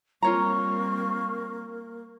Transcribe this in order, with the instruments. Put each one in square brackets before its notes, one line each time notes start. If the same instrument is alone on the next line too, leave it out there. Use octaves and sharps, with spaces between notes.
[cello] G3 C4 [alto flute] A#3 [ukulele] F4 C#5 A#5 [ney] C#6